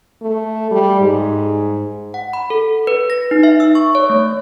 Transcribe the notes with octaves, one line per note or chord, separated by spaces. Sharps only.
A3
G3
G#2
F#5
B5
A4
B4
A#6
D#4
E5
E6
C#6
C#5
A3